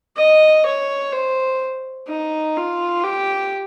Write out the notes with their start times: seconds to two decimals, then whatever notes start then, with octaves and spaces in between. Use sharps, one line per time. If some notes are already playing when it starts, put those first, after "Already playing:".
0.17 D#5
0.66 C#5
1.13 C5
2.08 D#4
2.57 F4
3.04 G4